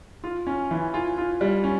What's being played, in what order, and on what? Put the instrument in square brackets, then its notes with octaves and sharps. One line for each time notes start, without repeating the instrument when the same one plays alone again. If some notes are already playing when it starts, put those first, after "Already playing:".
[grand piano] F4
C#4
E3
F4
F4
G3
C#4